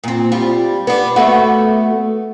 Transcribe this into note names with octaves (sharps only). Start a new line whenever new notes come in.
A#2 C4
G3 F4
B3 D4
A3 B3 F#4